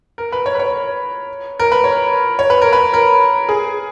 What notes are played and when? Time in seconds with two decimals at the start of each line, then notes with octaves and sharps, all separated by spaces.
0.18 A#4
0.32 B4
0.46 C#5
0.55 B4
0.59 C#5
1.60 A#4
1.72 B4
1.84 C#5
2.39 C#5
2.50 B4
2.62 A#4
2.73 B4
2.94 A#4
3.49 G#4